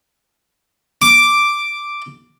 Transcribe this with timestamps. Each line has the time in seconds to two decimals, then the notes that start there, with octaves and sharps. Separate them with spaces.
1.02 D6